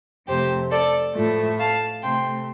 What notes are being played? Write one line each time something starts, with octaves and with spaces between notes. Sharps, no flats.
F2 C3 A3 G4 C5
A4 D5
A2 F3 A3
F5 A5
C3 A3 G5 C6